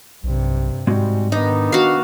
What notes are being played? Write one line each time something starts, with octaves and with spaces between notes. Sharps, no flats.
B1 G2 C3
G#2 G3 G#3 C4 F#4
D#3 B3 D4 D#4 D#5
F#4 F5